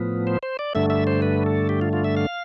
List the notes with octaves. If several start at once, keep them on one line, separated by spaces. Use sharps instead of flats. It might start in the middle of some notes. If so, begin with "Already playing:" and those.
Already playing: A2 F3 B3
C5
C5
D5
G2 D3 A3 E5
E5
C5
B4
A4
G4
F4
F4
E5
F5